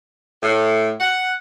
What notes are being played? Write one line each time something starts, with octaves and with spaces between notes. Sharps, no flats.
A2
F#5